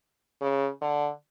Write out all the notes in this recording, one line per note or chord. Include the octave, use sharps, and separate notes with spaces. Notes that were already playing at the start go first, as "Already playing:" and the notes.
C#3
D3